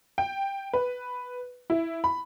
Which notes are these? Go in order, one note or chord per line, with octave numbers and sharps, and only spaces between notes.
G5
B4
E4
B5